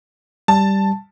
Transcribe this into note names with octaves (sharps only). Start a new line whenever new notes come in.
G3 A5